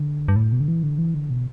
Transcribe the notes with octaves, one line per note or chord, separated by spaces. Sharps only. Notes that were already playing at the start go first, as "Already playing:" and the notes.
Already playing: D3
G2
A2
B2
D3
E3
D3
E3
D3
B2